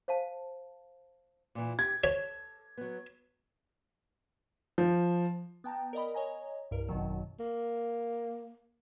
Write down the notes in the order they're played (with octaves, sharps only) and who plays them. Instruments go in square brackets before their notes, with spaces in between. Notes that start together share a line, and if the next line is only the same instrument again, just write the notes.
[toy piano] C5 F5 A5
[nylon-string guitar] A#2 E3
[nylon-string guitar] G4 [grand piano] G#6
[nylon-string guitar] A4 [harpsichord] C#5
[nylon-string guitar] F#3 B3
[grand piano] F3
[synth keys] B3 G5 A5 A#5
A#4 D5 D#5 B5
C#5 D#5 G#5 A#5
C2 G2 A#4
G#1 F#2 B2 D#3 F#3
[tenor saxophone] A#3